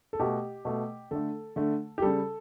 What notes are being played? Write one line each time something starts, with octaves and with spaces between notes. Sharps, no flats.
A4
B2 A3 G4
B2 A3
D3 A3 A4
D3 A3
G4
C#3 G3 A4